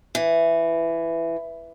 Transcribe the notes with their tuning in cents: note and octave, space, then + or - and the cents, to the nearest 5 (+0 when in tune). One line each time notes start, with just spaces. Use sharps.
E3 +10